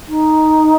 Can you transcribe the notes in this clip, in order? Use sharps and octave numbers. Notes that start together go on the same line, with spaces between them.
D#4